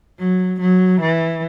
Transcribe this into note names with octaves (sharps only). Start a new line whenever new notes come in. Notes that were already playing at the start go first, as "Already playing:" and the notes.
F#3
F#3
E3